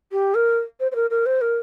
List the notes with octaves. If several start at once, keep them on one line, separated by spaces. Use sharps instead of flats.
G4
A#4
C5
C5
A#4
A#4
C5
A#4